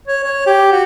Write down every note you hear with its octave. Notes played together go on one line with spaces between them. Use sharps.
C#5
C#5
G4
F#4